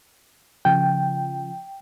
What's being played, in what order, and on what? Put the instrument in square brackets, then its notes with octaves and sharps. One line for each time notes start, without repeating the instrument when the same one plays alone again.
[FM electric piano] C#3 F3 [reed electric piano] G5